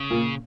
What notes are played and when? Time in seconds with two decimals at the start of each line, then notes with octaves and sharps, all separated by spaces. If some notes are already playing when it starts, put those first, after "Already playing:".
Already playing: C#3
0.10 A#2 A#3